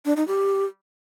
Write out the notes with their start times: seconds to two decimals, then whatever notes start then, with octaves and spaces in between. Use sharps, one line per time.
0.05 D4
0.17 D#4
0.28 G4